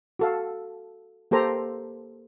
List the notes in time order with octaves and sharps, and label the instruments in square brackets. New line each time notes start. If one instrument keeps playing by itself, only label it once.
[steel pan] F#4 A4 F5
A#3 G4 A4 C5 A#5